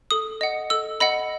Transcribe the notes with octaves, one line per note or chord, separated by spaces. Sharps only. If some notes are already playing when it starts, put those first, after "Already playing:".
A4 D#6
D#5 F#5
A4 E6
D#5 F#5 B5